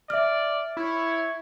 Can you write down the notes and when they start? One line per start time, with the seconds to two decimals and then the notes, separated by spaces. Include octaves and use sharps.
0.10 D5 E5 F6
0.77 E4 C#5